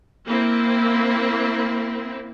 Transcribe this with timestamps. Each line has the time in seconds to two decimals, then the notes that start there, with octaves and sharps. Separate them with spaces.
0.25 A#3 C4 E4